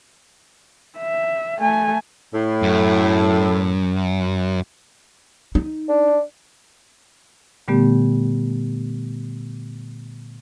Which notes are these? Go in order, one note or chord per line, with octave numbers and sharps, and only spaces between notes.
E5
A3 G#5
A2
F#2
D#4
D4
A#2 D3 G3 A3 B3 G4